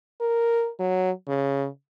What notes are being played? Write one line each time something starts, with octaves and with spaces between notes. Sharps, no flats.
A#4
F#3
C#3